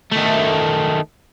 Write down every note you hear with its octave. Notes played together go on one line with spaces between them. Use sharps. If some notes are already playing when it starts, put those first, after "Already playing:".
D#3 A3